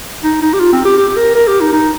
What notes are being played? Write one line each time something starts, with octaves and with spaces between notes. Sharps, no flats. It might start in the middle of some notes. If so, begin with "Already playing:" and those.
D#4
D#4
G4
F4
C4
G4
G4
G4
A#4
A#4
G4
D#4
D#4